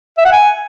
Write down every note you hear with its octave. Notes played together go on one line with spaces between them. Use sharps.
E5
F#5
G#5